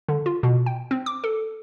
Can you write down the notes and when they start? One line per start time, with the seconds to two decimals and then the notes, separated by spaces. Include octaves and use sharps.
0.08 D3
0.26 F4
0.43 B2
0.66 G5
0.91 C4
1.06 D6
1.24 A4